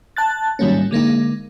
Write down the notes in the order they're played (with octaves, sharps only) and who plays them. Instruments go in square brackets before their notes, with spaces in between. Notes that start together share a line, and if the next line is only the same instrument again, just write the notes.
[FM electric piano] A5 F#6 A6
G#2 D#3 F#3 G3 A#3 C#4
D3 G#3 A#3 D#4